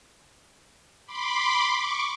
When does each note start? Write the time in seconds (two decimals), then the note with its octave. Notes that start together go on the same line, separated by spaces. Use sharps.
1.06 B5 C6 D6
1.76 C#6 D6